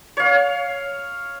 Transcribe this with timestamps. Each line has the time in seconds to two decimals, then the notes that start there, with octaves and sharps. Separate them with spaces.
0.17 C#5 F5